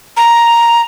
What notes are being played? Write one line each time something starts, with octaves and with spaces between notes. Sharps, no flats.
A#5